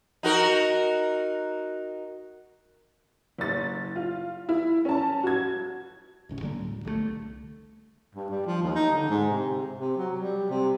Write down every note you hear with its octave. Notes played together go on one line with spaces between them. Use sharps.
D#4 F#4 A#4
F#1 A6
F4
E4
C#4 A5
F#4 G#6
D1 G1 C#3
G1 D3 G3 A#3
D1
C2 D3 G3 A3
G2
G3
F3
D#2
D#4
D3
G#2
C3
C3
F#3
G3
C3